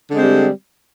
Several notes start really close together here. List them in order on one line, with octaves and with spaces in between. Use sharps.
D3 G#3 C4 G3